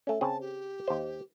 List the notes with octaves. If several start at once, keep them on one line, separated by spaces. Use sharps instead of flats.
A3 C#4 A4
C#3 C4 G#4 A5
G4
D#2 C5